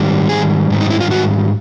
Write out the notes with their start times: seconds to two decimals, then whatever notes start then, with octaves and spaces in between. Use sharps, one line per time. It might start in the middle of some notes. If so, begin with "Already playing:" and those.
Already playing: G#2 D#3 G3
0.29 G#4
0.70 G#2 D#3 G3
0.81 D#4
0.90 E4
1.00 F4
1.11 F#4